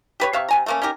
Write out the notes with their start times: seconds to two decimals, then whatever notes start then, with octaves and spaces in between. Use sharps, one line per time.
0.20 G4 B4 C#5
0.33 C3 E5 F5 C#6
0.49 C3 G#5 A#5
0.66 A3 A#3 C#4
0.82 C#4 D#4 G4 A#4